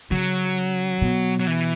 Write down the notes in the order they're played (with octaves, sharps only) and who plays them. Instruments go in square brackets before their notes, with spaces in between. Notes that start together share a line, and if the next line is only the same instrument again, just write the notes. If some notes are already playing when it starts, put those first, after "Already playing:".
[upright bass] C#3 [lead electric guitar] F#3
[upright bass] B2
[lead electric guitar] F#3
E3